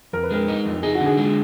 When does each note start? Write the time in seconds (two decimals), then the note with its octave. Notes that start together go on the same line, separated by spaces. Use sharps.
0.13 F2 A#4
0.23 B4
0.31 G#3 A#4
0.48 D#4
0.66 F2
0.83 D#4 G#4
0.95 F#4
1.01 D3
1.06 G#4
1.17 G#3